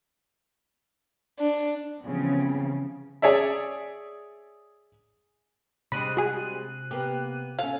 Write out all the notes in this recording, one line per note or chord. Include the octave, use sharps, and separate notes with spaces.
D4
C#3 E3 F3 G3 B3 C4
G#4 C#5 D5 E5
C3 G3 G#3 D4 B5 F#6 D#7
F#4 G#4
A#3 B3 G4
C#4 A4 F5